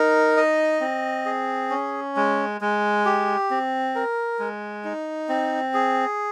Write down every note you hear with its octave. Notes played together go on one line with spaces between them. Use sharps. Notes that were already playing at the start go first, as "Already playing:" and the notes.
Already playing: D#4 A#4
D#5
C4
G#4
C#4
G#3
G#3
G4
C4
A#4
G#3
D#4
C4
G#4